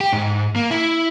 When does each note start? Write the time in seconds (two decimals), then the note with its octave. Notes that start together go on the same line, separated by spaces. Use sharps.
0.01 G4
0.13 G#2
0.56 A#3
0.71 E4